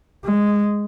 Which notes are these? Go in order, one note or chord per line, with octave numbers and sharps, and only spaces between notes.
G#3